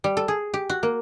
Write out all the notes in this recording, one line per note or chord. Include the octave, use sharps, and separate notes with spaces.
G3
A4
G#4
G4
F#4
A#3